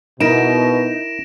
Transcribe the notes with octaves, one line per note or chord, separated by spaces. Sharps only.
B2 D#4 E4 A#4 A#5 A#6 D7 E7